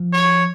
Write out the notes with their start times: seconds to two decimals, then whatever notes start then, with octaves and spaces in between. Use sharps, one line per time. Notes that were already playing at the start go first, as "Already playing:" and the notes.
Already playing: F3
0.13 C#5